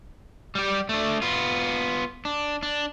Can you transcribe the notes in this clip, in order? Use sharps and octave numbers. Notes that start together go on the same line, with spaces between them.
G3 G4
A3 D4
B3 F4
D4
D4